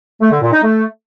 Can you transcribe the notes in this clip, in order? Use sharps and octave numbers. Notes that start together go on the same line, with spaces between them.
A3
D3
A#2
D#4
A3